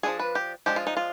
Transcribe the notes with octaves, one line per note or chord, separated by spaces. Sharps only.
F3 G#3 D4 G#4
B4
G4
F3 G#3 D4 G4
F4
D#4
F4